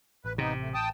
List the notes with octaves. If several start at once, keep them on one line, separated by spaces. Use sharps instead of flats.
A1 B4
C3 B3 D#4
A3
G5 A5 D#6